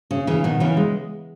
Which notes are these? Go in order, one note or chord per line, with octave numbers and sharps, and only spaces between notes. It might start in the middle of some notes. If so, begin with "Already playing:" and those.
C#3
C#3 E3
B2 D#3
C#3 E3
G#3